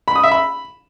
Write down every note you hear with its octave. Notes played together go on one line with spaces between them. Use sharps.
B5
D#6
E5
B5